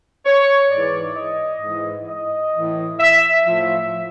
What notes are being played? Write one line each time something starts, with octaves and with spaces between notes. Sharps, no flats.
C#5
G#2 E3 D5
D#5
G#2 E3
D#5
A2 E3
E5
F3 E5
A2